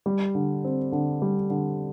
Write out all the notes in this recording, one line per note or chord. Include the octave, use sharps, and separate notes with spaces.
G3
D3
C4
D3
G3
D3